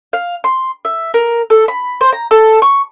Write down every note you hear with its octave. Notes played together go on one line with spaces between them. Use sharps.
F5
C6
E5
A#4
A4
B5
C5
A#5
A4
C#6